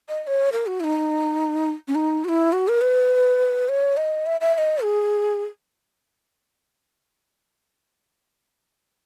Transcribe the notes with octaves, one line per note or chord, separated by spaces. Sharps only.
D#5
D#5
C#5
A#4
F#4
E4
D#4
C#4
D#4
F#4
E4
F#4
A#4
B4
C#5
D#5
E5
E5
E5
D#5
G#4